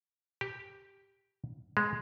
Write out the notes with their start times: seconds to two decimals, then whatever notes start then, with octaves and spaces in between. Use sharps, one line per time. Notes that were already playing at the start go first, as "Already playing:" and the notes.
0.41 G4
1.77 G#3